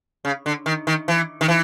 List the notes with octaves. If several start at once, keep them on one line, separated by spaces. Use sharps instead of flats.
C#3
D3
D#3
D#3
E3
D#3
E3